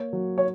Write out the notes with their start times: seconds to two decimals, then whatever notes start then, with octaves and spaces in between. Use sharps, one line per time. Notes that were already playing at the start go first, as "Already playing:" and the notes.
Already playing: A#3 C#5
0.13 F#3
0.38 C#5